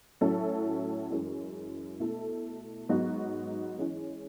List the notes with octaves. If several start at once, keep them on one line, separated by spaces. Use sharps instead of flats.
A2 F#3 C#4 E4 A4
F#2 E3 G#3 C#4
B2 A3 E4 A4
G#2 F#3 B3 D#4 F#4
E3 G#3 C#4